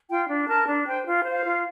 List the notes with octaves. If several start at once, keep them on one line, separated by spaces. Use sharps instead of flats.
F4 G5
D4
A#4 A5
D4
C5 G5
F4
C5 F5
F4